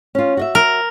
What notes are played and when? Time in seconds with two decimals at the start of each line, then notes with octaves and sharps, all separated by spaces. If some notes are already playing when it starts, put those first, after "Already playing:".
0.15 C#4 F4
0.37 F#4 D#5 E5
0.55 A#4